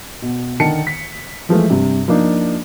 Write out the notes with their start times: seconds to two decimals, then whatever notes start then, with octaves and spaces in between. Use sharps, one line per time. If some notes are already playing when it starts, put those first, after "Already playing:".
0.22 B2
0.60 D3 D#3 A5 C#7
0.87 B6
1.49 E3 F3 G#3 A3
1.70 G2 C3
2.08 F3 A#3 D4 D#4